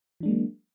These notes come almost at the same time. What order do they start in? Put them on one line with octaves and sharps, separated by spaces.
E3 D4 G#3 A#3 F#3